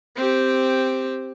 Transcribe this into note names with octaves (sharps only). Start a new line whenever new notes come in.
C4 G4